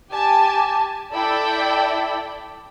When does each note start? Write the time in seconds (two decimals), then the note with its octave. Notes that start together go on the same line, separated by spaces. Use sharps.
0.12 G4 G#5 A5
1.13 E4 A4 D5 G5 A5 B5